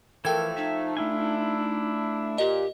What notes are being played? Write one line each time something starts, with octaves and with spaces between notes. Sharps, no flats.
E3 F3 A3 A4 A#4 G5 G#6
D#4 E5
A3 D4 E4 F4 G#5
A#2 G4 D#5